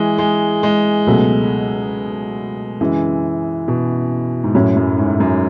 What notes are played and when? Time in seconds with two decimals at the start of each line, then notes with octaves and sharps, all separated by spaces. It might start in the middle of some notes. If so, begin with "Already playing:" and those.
Already playing: E3 G#3
0.18 G#3
0.63 G#3
1.07 C#2 B2 F#3 A3
2.81 F#2 C#3 E3 G#3
3.68 B2
4.44 G#2
4.54 F#2 A2 F#3 C#4
4.76 F#2
4.98 G#2
5.20 F#2